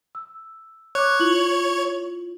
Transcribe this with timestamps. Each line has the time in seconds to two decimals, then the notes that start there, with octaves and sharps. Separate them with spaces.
0.15 E6
0.95 C#5 D6 F#6
1.20 E4 F4 F#7